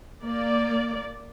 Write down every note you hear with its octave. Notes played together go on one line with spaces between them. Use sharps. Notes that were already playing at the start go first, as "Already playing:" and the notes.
A#3 D5